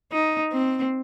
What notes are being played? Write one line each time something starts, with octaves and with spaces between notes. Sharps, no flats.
D#4
C4